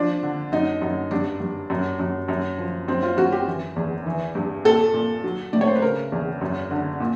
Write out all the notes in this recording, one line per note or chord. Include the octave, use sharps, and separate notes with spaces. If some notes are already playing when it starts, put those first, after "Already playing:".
Already playing: F3 D4
D3
F#2 D#4
F#2
G2 D4
G2
F#2
F#2
F#2
F3
F#2 C4
F4
F#2 F#4
G4
E3
E2
E3
G2
A#2 A4
A#2
F#3
A2 D5
C#5
C5
B4
C#3 A#4
E2
F#2
D3
A#2